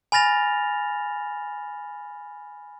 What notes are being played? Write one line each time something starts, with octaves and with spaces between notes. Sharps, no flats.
G#5 B5 F6 A6 A#6 F7